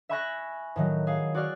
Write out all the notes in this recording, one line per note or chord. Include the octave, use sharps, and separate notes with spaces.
E5 G#5 B5 C#6 F#6 A#6
A2 D#3 F#3
G#4 F5
F#4 D5 C#6 F6